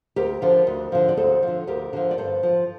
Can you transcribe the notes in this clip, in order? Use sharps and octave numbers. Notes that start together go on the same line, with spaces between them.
D2 G4 A#4
D3 F3
D2
D3 F3
D5
D2 A4 C5
D3 F3
D2 G4 A#4
D3 F3
D5
G2 A4 C5
F3